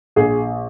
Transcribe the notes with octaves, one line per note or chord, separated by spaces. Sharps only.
A#1 G#4